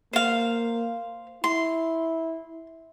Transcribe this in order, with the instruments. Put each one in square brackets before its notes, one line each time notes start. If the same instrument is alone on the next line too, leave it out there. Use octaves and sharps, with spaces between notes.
[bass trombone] A#3 [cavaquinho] C5 F5
[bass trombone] E4 [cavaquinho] C6